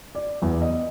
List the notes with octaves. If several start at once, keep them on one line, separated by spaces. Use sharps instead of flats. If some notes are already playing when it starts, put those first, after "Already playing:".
D5
E2
D#5